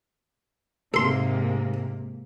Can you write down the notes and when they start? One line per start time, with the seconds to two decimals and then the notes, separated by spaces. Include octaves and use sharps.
0.94 G#2 C3 A#3 A4 C6